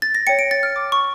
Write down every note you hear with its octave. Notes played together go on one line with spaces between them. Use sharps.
A6
A#6
C#5 G5 C#7
D7
A6
F6
D6
C#6